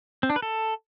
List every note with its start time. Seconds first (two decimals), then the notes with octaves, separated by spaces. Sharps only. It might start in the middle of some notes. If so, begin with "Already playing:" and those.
0.23 C4
0.30 D4
0.36 B4
0.42 A4